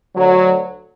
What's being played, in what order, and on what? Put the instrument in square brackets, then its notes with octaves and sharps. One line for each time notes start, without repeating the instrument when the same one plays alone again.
[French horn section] D2 D3 F#3